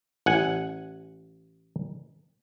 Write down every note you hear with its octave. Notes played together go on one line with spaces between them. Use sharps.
A1 F#5 G#5